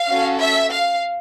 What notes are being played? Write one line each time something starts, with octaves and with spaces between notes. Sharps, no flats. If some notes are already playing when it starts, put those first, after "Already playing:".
Already playing: F5
C#4 F#4 A4
E5
F5